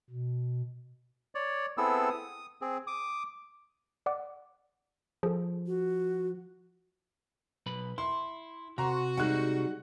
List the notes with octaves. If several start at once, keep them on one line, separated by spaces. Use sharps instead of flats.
B2
C#5 D5
B3 C4 E4 G#4 A4 E6
D#6
C4 G#4
D6 D#6
D5 F#5 D6
F3 G#4 A4
F#4
B1 B4 B5
E4 C6
C3 F#4 A#5 C6
G3 G#3 D#4 F#5 F#6